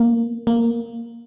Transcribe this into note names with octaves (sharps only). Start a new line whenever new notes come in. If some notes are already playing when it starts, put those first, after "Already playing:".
Already playing: A#3
A#3